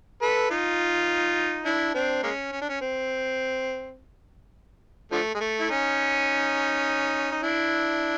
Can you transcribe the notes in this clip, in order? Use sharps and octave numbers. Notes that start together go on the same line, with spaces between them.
A4 B4
D#4 F4
D4 E4
C4 D4
G#3 A#3 C#4
C#4
D4
C#4
C4
D3 F3 A3
G#3
A3
E4
C#4 D#4
D#4
D4 E4